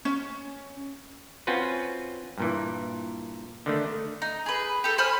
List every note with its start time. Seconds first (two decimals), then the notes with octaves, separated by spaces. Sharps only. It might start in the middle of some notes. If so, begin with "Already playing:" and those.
0.05 C#4
1.47 C4 C#4 F4 F#4 B4
2.38 G2 A#2 E3
3.66 D3 D#3 A3
4.22 D#4
4.46 G#4 B4
4.84 G4 A4
4.98 C5 G#5 B5 F6